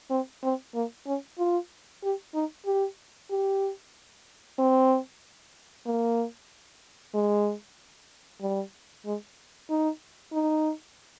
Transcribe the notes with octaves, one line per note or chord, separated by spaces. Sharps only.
C4
C4
A#3
C#4
F4
G4
D#4
G4
G4
C4
A#3
G#3
G3
G#3
D#4
D#4